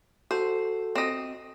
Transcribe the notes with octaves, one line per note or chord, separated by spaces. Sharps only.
F#4 A4 C5
C4 D#5